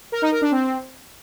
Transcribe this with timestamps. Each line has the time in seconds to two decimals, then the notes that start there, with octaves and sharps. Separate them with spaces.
0.12 A#4
0.22 D#4
0.32 A#4
0.42 D4
0.51 C4